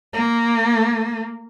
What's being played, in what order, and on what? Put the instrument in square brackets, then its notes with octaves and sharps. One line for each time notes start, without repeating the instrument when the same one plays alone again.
[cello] A#3